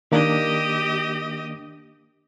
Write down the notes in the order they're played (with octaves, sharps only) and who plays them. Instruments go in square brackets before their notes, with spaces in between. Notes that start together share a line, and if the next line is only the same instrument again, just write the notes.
[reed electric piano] D#3 A#3 D4 [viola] G4 D#5